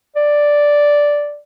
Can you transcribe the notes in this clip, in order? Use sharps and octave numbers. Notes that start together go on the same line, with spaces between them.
D5